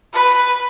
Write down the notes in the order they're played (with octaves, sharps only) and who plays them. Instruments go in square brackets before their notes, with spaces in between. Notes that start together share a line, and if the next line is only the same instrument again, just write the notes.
[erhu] B4